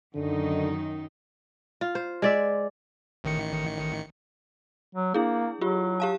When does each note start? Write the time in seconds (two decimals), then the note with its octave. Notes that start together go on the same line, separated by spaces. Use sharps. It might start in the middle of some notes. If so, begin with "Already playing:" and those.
0.15 F#2 D3 D#3 D#4
1.81 F4
1.95 C5
2.22 G#3 D5 E5
3.24 A1 D#3 C#7
4.95 F#3
5.14 A#3 D4 E4 G#4
5.61 F#3 F4 G4
6.00 G4 F5 A5